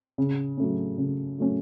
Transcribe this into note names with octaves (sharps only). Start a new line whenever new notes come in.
C#3
F#3 A3 C#4
C#3
F#3 A3 C#4